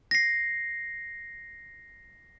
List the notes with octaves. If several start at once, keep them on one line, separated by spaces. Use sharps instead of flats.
A#6 C7